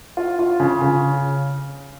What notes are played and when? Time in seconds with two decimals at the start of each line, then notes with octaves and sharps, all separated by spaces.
0.17 F4
0.39 F4
0.60 C#3
0.82 C#3